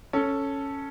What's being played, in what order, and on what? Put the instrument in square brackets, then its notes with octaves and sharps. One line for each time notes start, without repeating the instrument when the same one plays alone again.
[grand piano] C#4 [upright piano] A4